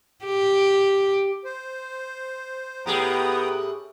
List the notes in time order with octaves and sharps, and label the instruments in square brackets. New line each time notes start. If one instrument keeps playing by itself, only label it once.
[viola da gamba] G4
[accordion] C5
[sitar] A2 G4 G#4 [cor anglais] B3 [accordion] G5 A#5 D#6